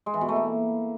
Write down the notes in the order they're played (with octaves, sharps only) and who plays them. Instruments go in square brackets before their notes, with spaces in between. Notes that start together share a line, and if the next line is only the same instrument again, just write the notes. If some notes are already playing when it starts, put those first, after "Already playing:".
[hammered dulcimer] G#3
E3
B2
A3
A#3